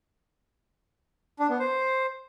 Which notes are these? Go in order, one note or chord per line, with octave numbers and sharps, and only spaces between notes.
D4
B3
C5